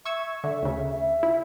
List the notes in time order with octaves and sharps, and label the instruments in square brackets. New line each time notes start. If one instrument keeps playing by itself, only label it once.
[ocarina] E5 [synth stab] C#6 E6 G#6
[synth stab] D3 [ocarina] E5
[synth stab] D2 C#3
[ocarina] E5
[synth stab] E4